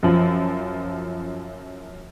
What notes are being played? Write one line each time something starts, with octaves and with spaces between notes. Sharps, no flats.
F#2 F3